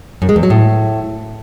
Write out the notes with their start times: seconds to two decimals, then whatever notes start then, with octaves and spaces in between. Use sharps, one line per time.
0.22 F#2
0.29 G#3
0.36 E2
0.43 F#3
0.50 A2